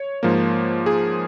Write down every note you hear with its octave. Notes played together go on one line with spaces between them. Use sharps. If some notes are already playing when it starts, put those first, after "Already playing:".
Already playing: C#5
G#2 F3 A#3
G#4